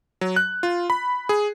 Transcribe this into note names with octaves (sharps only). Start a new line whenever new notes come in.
F#3
F#6
F4
B5
G#4